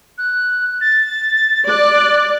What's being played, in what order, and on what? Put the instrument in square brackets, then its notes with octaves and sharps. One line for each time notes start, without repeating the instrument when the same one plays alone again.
[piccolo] F#6
A6
[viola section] D5 [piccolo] F#6